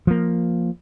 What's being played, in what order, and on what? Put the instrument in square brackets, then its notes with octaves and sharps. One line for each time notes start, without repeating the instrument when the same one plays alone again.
[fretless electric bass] F3 A#3